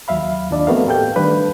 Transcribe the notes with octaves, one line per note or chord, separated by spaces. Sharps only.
D#2 F#3 E5 F5 B5
D#2 F3 D4 D5 D#5
A3 B3 C4 F#4 A#4 F5
A2 G4 A4 F5 G5 G6
D#3 G3 A3 D4 B4